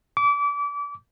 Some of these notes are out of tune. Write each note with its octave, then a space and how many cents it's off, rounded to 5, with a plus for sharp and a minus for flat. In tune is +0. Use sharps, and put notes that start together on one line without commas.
D6 -30